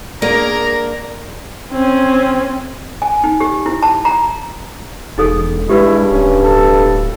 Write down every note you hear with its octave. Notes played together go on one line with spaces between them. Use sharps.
A#3 D4 G#4 A#4 A#5
C4 C#4
G#5
D#4
G4
E4
A5
A#5
E1 D#4 G#4 A4
G2 G#3 E4 G4 B4
D1 C#4
A4